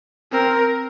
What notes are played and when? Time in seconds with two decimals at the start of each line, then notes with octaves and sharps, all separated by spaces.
0.32 C4 A#4